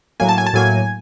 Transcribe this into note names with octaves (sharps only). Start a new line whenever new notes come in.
A2 F#3 A#3 G#5
A5
G#5
A5
A2 F#3 A#3 G#5